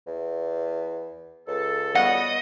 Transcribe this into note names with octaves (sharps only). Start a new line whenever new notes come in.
E2
C#2 A4
G3 B3 F#4 D#5 F#5